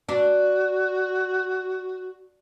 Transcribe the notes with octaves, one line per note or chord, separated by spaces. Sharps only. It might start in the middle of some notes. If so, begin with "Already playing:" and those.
D4 F#4